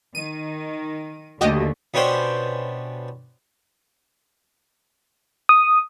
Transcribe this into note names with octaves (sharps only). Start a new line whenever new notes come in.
D#3 D#7
D#2 D3 A3 F#4 G4 D#5
B2 C#4 D4 G4 C5 E5
D#6